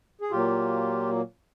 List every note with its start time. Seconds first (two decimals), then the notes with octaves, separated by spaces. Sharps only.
0.21 G#4
0.31 A#2 F#3 A#3 F4 G4